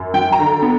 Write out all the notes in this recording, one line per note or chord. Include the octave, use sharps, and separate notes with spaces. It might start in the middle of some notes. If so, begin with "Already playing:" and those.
Already playing: F#2
F#3 G5
A#5
D3
B3